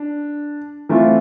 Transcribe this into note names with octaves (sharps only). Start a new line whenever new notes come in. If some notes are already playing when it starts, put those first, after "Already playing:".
Already playing: D4
E3 A3 C4 F4